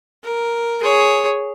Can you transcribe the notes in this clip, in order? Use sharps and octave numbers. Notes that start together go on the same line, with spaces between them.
A#4
G#4 C#5